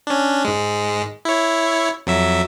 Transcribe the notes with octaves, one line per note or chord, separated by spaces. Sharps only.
C#4 D4
G#2 G#3
E4 C#5
F2 F#3 E5